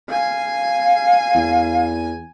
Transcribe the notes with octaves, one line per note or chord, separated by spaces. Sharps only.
F5 G#5
E2